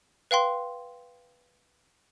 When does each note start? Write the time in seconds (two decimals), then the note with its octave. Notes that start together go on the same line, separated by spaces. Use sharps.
0.31 B4 F5 G5 C6